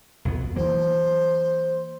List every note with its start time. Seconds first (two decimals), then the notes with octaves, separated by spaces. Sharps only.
0.25 B1 F2 B3
0.56 E3 F#3 A#3 C5